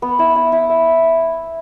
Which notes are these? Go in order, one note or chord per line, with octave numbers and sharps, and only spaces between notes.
B3
E4
E4
E4
E5